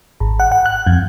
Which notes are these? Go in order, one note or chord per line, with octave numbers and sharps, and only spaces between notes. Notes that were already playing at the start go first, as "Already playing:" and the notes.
G#1
F#5
F#5
F#6
F2